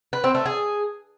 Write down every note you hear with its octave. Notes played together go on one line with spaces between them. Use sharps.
B4
C4
A3
G#4